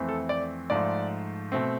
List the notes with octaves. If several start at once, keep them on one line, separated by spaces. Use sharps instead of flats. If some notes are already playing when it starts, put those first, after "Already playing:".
Already playing: F2 E3 A3 C4
A4
D5
G#2 F3 A3 D5
B2 A3 C4